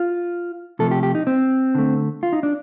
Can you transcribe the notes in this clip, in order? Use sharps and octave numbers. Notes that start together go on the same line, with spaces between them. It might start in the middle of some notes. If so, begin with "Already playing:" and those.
Already playing: F4
C3 F3 A3 A4
G4
G4
D#4
C4
D3 A3
F4
D#4
D4